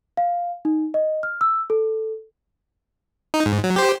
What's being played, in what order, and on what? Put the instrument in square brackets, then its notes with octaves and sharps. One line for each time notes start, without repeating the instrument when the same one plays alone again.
[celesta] F5
D#4
D#5
F6
E6
A4
[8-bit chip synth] D#4
G#2
F#3
G4 C5